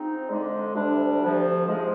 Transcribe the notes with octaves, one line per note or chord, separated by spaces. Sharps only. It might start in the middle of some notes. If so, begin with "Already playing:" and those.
Already playing: G#2 F3 C4 D#4
F2 D3 G#3 D4
D2 C3 G3 D4
D2 C3 F3
G#2 F3 G#3